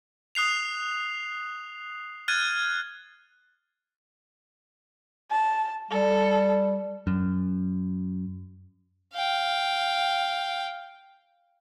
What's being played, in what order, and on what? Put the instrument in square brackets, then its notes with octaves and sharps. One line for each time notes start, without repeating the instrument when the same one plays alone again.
[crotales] D#6 F#6 C7 F7
F6 F#6 G#6 A6 D#7
[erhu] A5
[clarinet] G3 [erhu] A4
[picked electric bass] F#2
[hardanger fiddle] F5 G5